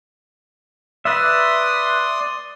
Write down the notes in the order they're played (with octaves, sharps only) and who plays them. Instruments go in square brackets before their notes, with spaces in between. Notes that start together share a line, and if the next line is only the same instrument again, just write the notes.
[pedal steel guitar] B4 E5 [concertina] D5 C6 D#6